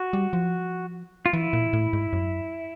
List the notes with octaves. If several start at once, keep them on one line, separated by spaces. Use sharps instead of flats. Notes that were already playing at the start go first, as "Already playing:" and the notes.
Already playing: F#4
G3
F3
F4
E3 E4
A#2
A2
G#2
F#2